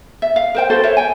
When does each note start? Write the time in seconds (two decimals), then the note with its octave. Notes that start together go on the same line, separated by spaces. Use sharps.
0.22 E5
0.36 F5
0.55 A#4 C5 G5
0.70 F#4 A4 B4 C5
0.83 A#4 C5 C#5 E5
0.97 G5 G#5